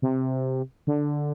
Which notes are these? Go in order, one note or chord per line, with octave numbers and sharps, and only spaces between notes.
C3
D3